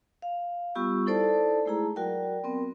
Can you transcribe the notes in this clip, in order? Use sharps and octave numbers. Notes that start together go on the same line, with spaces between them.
F5
G3 B3 F4 G4 C#6 E6
D#4 E4 A4 C5 D5 A5
G#3 A3 E4 G#4 A#5
F#3 F#4 A#4 D5 G5
B3 C4 A#4